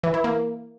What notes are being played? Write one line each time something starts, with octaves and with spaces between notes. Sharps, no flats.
E3
E4
A#3